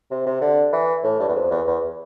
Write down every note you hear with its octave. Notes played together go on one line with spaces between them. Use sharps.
C3
C3
D3
E3
A2
G2
E2
F2
E2
E2